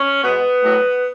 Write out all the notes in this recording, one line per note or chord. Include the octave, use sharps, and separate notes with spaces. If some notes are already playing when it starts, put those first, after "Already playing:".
Already playing: C#4
B2 G#3 B3
A2 F#3